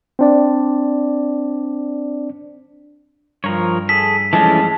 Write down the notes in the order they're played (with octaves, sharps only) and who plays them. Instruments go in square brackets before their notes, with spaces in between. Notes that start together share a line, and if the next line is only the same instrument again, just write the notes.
[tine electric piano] C4 D4 D5
[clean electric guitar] G2 [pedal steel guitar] F3 A#4 C#5
[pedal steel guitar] G#4 A4 [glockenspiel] B6
[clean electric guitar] G2 F3 G#3 [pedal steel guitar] E3 A3 C#4 [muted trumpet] A5